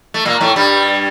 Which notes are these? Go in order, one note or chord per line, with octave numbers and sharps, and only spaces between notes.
A3
A#2 A#3
A2 A3
G2 G3